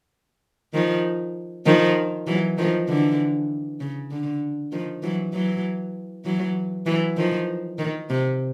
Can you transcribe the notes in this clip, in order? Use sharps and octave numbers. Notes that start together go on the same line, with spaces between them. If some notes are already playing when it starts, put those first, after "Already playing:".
D#3 F3
D#3 F3
E3 F#3
D#3 F3
D3 E3
C#3
D3
D#3 F3
E3 F#3
E3 F#3
E3 F#3
E3 F#3
D#3 F3
D#3
C3